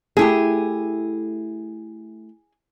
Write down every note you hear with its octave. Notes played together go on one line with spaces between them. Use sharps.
A3 E4 G4 G#4